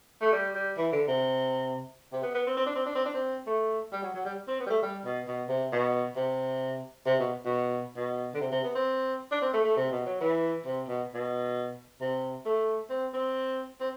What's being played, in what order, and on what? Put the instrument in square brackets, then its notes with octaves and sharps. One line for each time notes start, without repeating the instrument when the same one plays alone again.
[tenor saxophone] A3
G3
G3
E3
D3
C3
C3
B3
B3
C4
C4
D4
C4
D4
C4
D4
C4
A3
G3
F#3
F#3
G3
C4
B3
G3
A3
G3
B2
B2
C3
B2
C3
C3
B2
B2
B2
D3
C3
C3
B3
C4
D4
C4
A3
A3
C3
B2
F#3
E3
C3
B2
B2
C3
A3
C4
C4
C4